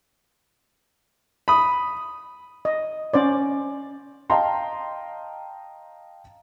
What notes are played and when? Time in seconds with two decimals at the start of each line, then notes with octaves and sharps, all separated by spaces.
1.48 B5 D#6
2.65 D#5
3.14 C#4 C5 D5
4.30 D#5 F5 G5 A5 A#5 C6